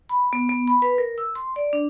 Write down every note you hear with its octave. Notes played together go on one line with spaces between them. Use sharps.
B5
B3
B3
B5
B4
A#4
E6
C6
D5
D4